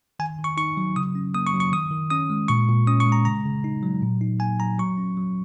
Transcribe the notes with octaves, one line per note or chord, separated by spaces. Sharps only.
D#3 G#5
D#3
C#6
D#4 C#6
F#3
C#3 D#6
C#4
A#3 D#6
C#6
F#3
C#6
D#3 D#6
D#3
C#4 D#6
G#3
A#2 C#6
A#2
C#4 D#6
C#6
G#3
A#5
C#3 A#5
C#3
D#4
F#3
A#2
D#4
A#3 G#5
F#3 A#5
F#3 C#6
C#4
F#3